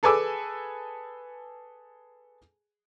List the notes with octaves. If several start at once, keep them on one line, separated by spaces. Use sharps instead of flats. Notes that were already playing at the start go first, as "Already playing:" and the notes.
G#4 A4 B4 G#5 D6 E6